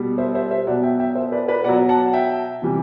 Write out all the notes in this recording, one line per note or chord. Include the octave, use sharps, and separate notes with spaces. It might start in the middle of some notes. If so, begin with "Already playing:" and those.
Already playing: B2 G3
C5 E5
C5 E5
C5 E5
B2 F#3 D5 F#5
E5 G5
E5 G5
C5 E5
B4 D5
B4 D5
B2 F#3 D5 F#5
F#5 A5
E5 G5
C3 E3 G3